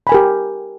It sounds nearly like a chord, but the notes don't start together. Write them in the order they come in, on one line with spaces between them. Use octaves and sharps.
B5 G#5 A#4 G4